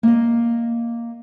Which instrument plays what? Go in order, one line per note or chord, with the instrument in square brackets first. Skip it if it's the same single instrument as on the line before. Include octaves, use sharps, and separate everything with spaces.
[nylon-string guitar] A#3 D#5